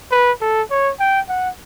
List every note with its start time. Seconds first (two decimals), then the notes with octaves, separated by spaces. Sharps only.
0.11 B4
0.41 A4
0.70 C#5
1.00 G5
1.28 F#5